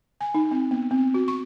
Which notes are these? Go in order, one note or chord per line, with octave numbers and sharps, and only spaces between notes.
G#5
D#4
C4
B3
C4
F#4
C#6